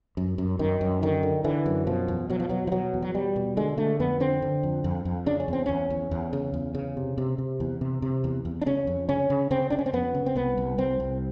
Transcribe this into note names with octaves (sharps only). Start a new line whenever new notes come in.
F#2
F#2
F#2 D#3
F#2
D3 D#3
D3
D3 E3
F#2
B2 F3
E2
B2 F#3
F3
B2 F#3
F3
B2 F#3
E2
F#3
B2 G3
B2
D3 G#3
D3 A3
F2 B3
D3 C4
D3
F2
F2
F2
C#3 D4
C#4
E2 C4
E2 C#4
E2
E2
C#3
E2
C#3
C3
C3
C3
E2
C3
C3
E2
E2
D4
C#3 C#4
F2
C#3 C#4
C#3
C#3 C4
C#3 D4
C#4
C4
F2 B3
C#3
C4
C2 B3
C2
C2 C4
C2